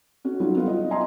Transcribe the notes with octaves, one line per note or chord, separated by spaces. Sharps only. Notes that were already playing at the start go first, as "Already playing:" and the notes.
C#4 F#4
F#3 G3 C#4 D#4 F4
B3 F4
D#5
D#5 E5 G#5 A#5 C6